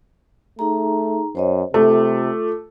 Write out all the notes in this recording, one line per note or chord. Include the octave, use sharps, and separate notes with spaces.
A3 D#4 G#4 A#5
F#2 C5 C#5 D#5
C3 A3 F4 D6